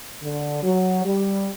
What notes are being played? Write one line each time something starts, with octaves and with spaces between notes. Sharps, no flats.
D3
F#3
G3